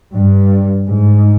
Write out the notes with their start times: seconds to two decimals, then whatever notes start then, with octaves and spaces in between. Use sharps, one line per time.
0.16 G2
0.88 G#2